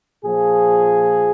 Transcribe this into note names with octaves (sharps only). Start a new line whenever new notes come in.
A#2 F3 G#4